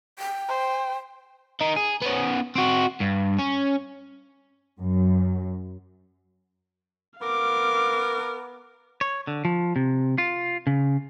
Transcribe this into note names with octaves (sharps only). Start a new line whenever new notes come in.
G5
C5
D#3 D#4
G#4
B3 C#4
C4 F#4
G2
C#4
F#2
B3 A#4 F5 D6
C#5
D3
F3
C3
F4
C#3